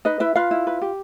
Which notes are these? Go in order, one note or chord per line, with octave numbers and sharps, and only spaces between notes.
D#4 B4 D#5
E4 B4 E5
F4 B4 F5
E4
B4
G4